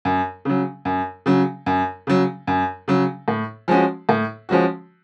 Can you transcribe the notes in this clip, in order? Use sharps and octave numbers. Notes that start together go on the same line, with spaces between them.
F#2
C#3 F#3
F#2
C#3 F#3
F#2
C#3 F#3
F#2
C#3 F#3
A2
F3 G#3 C#4 F#4
A2
F3 G#3 C#4 F#4